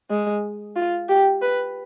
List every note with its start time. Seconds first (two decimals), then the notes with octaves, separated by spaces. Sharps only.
0.10 G#3
0.76 F4
1.09 G4
1.42 B4